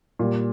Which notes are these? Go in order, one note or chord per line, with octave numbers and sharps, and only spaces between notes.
A#2 G3